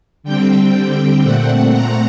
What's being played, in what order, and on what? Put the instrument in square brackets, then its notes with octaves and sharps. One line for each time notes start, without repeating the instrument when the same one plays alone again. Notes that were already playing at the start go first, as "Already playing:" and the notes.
[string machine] D3 G3 C4 G5
A#2 A3 C4 F#5
A#5